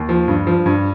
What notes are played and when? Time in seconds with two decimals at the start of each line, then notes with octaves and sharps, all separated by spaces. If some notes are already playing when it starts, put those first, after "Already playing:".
Already playing: D#2
0.09 F3
0.28 G2
0.47 F3
0.66 G2